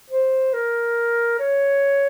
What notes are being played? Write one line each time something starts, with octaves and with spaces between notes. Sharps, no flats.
C5
A#4
C#5